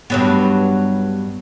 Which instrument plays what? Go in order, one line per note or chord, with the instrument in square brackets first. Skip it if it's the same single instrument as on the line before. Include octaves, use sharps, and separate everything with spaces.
[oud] G2 F#3 B3